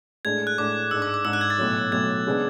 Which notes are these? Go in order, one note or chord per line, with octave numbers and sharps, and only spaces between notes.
A2 G#3 D4 G#6
F#6
A2 G#3 D4 D6
G#2 G#3 D4 E6
D6
D6
G#2 G#3 D4 E6
F#6
G#6
A6
B1 A2 F#3
B1 A2 F#3 G#6
C#3 G#3 B3 D4